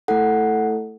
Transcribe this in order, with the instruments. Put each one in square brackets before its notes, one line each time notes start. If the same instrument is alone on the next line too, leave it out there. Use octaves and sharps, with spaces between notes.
[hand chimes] A3 E4 A4 F#5